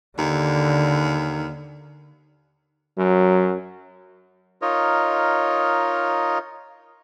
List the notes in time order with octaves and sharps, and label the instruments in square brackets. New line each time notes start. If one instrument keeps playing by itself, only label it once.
[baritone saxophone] D#2 [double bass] D3
[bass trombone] F#2 [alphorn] F#3
[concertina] D#4 F4 A#4 C#5 D#5